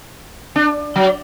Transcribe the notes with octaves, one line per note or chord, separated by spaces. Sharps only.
D4
F#3